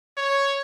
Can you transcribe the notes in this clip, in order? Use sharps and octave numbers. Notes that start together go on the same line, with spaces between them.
C#5